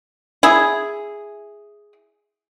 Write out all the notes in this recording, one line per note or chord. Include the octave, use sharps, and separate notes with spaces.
E4 G#4